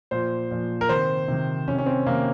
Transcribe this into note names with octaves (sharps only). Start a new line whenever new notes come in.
A#2 F3 C5
A#2 F3
A#4
C3 D#3 C5
C3 D#3
C3 D#3 C#4
C#4
C4
C3 D#3 A#3